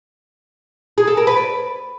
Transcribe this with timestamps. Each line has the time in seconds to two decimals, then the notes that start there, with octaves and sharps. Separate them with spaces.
0.98 G#4
1.07 A4
1.17 A#4
1.27 B4
1.37 D5